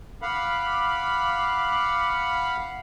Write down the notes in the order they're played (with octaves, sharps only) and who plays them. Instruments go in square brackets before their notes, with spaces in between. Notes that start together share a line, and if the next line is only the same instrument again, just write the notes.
[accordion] F5 F#5 B5 [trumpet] D6